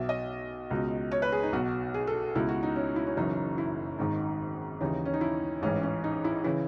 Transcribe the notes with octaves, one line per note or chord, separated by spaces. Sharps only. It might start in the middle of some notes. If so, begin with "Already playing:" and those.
Already playing: B1 B2 E5
D#5
C#2 B2
C#5
B4
G#4
D#4
B1 B2 F#4
G#4
A4
C#2 B2 E4
F#4
D#4
C#4
E4
C#4
F#1 F#2 E3 D#4
E4
G#1 G#2 D#3 D#4
D#2 C#3 E3 D#4
C#4
D#4
E4
A1 G#2 E3 C#4
C#4
D#4
E4
C#3 E3 E4